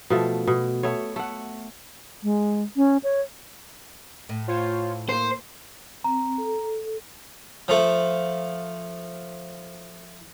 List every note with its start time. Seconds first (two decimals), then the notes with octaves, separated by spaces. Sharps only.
0.10 B2 F3 A3
0.47 B2
0.83 A3 B3 C#5
1.16 A3 F#5
2.23 G#3
2.76 C#4
3.03 C#5
4.29 A2
4.48 F4 C5 C#5
5.09 A#3 C5
6.04 C4 A#5
6.38 A4
6.85 A4
7.68 F3 A3